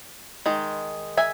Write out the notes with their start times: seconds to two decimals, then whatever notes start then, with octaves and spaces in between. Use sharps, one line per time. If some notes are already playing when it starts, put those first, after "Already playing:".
0.46 D#3 G#3
1.17 E5 G#5